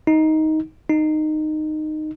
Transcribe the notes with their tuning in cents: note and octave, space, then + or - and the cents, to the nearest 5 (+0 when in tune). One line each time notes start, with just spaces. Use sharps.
D#4 +10
D#4 -15